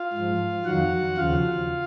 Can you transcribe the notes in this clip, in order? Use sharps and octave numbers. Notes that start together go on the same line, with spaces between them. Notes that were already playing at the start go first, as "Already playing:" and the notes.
Already playing: F4 F5
G#2 F3
F2 D#3 F#3 F#4 F#5
D#2 C#3 F3 F4 F5